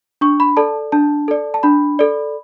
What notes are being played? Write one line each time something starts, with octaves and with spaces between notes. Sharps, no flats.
D4 C#6
B5
A4 D5 A5
D4 A5
A4 D5
A5
D4 B5
A4 D5